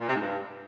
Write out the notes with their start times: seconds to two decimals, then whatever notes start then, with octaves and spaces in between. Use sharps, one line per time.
0.01 A#2
0.07 C3
0.14 G#2
0.20 G2